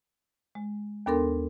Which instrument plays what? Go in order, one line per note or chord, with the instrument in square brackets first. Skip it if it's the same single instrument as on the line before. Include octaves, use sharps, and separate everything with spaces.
[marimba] G#3
D#2 B3 D4 A4 A#4 C6